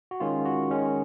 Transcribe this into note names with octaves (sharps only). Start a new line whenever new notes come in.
F#4
D#3 G#3 C#4 F4
F#4
D#3 G#3 C#4